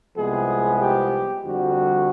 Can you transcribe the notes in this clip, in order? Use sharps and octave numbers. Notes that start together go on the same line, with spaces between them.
C2 C3 F3 G#3 B3 G#4
G4
F2 D3 G3 F#4